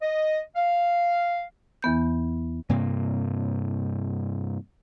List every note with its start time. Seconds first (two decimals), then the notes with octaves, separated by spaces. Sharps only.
0.02 D#5
0.56 F5
1.82 E2 E3 B3 G6
2.69 G2 C3 A#3